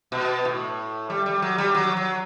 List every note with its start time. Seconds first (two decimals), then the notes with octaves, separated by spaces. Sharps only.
0.12 B2
0.45 A2
1.10 G3
1.26 G3
1.42 F#3
1.58 G3
1.74 F#3
1.97 F#3